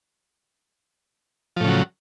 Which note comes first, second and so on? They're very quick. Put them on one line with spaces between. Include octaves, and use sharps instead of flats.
F3 A2 C#3 F#3